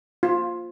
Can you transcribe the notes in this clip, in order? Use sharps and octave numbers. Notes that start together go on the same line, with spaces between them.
F4